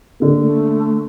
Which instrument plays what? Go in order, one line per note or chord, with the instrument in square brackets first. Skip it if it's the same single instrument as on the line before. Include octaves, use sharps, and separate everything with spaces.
[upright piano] D3 A#3
[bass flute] A3